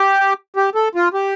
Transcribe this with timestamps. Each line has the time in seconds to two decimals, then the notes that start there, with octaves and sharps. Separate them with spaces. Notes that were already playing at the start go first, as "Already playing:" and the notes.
Already playing: G4
0.56 G4
0.75 A4
0.95 F4
1.14 G4